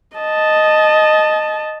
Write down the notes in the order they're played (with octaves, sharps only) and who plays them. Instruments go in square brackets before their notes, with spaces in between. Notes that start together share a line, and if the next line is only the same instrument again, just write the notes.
[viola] D#5 A5